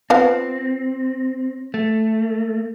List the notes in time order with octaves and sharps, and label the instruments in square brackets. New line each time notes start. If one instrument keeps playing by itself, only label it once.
[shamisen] B3 F4 F5 [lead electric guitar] C4
[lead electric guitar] A3